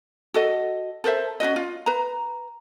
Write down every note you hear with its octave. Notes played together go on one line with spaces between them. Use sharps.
F#4 A4 D#5
A4 A#4 C5 E5
C#4 D#4 F#4 D#5
F4
B4 A#5